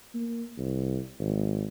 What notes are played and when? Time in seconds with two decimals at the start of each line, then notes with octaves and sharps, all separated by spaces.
0.14 A#3
0.58 C2
1.19 G#1